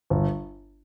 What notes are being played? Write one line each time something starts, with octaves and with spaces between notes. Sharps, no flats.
G1